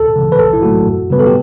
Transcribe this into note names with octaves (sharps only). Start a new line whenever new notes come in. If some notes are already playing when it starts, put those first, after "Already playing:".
Already playing: D2 A4
C#3 E3
B4
B1 A4
E4
A2 F#3 A3 F#4
F#2
C#3 G3 B3 B4
A4
G4